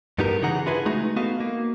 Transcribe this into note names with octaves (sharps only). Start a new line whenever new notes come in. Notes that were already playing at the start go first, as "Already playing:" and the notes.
G2 B3 D#4 G4 A#4
C#3 E3 D#4 G#4 F#5 A#5
D4 E4 F4 G#4 B4 G#5
G#3 A3 D#4 F#4
A3 B3 F#4 D#5 F5
A#3